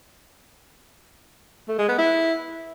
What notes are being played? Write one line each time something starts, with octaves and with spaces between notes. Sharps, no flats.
A3
G#3
B3
E4